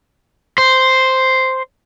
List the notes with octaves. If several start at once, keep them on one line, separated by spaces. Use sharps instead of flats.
C5